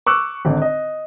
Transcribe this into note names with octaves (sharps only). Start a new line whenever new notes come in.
C#6 D6 E6 F#6
G#1 D3
D#5